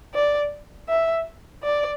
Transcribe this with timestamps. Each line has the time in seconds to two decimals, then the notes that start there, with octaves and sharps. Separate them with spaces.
0.14 D5
0.89 E5
1.64 D5